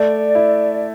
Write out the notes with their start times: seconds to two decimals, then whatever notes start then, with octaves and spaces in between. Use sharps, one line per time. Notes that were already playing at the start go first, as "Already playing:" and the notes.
Already playing: A3 D5
0.35 E4